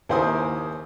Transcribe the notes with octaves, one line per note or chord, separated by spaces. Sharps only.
D#2 E4 C5 G#5 D#6